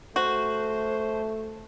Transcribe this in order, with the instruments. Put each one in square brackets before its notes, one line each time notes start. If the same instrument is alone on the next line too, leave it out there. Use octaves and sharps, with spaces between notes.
[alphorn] A3 [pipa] F#4 [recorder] C5